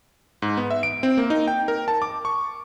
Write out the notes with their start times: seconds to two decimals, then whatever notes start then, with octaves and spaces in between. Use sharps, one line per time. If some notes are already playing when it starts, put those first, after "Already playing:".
0.42 G#2
0.57 B3
0.71 E5
0.83 D7
1.03 C4
1.17 A#3
1.30 D#4
1.48 G5
1.68 A#4
1.88 A5
2.02 D6
2.25 C#6